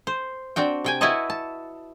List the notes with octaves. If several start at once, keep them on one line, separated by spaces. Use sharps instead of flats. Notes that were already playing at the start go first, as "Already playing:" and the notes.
C5
C4 D4 F#4 G5
C3 G5 G#5
E4 F#4 B4 C#5 D#5 A5
A5